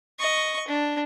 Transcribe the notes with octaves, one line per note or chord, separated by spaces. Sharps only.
D#5 C#6
D4